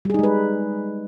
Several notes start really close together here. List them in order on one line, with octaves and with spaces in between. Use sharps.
G3 G#4 D#4 G#3 B4